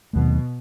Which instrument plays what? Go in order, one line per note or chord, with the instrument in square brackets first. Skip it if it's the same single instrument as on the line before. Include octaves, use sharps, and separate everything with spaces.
[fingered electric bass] D#2 D#3 F#3 A3 [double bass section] B2